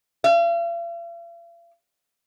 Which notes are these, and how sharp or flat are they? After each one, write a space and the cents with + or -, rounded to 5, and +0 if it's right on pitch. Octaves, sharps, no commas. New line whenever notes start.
F5 -45